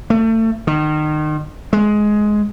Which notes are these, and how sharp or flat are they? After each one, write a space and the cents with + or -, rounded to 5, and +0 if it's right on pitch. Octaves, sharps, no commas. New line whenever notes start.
A3 +30
D#3 -30
G#3 +15